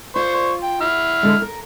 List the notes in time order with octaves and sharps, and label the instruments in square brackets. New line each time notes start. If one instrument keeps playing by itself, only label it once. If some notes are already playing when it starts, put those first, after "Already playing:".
[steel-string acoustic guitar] F4 [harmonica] C5 C#6
[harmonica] G5
E4 F6
[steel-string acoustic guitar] D3 G#3
A#4